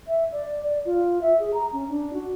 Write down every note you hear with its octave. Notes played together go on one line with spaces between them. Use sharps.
E5
D5
D5
F4
E5
G#4
A#5
C#4
D4
F#4